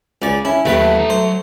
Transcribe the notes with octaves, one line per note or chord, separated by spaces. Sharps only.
C#2 C#4 D5
C#4 E4
D#2 D#3 F#3 A3 B4 G5
D4 A#5
F#3 C5